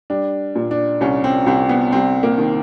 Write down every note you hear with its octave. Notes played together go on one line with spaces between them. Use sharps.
G3 D4
A#2
D4
C2 C#4
C4
C2 C4
B3
G3 C4
A#3
D#3